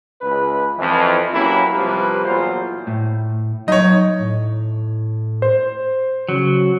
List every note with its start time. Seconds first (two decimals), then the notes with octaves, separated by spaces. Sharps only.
0.22 C#2 B4
0.78 F2 E3
1.34 F#3 A#3 C#4 E4 G4 B4
1.73 C3 F3 G3 A#3 B4
2.25 E2 A#2 F#3 F4 C5
2.87 A2
3.68 F#3 D#4 C#5 D#5
4.18 A2
5.42 C5
6.29 C#3 F#3